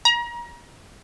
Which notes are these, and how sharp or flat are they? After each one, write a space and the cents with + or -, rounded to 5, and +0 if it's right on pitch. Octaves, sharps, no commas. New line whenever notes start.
A#5 +30